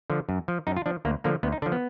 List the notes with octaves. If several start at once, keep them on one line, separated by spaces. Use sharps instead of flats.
D3 F3
F#2
F3
F#2 D#4
F4
F3 D4
D2 A#3
D3 F3 A#3
D2 B3
D#4
D3 F3 D4
B3